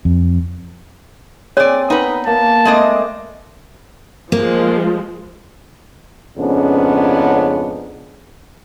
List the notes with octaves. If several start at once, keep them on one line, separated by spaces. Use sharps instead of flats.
F2
C4 G#4 C#5 D5 G#5
B3 D#4 B4
A#3 A5
G#3 A3 C4 D5 D#5
F3 G#3 A#3
F2 G#2 C#3 B3 C#4 D4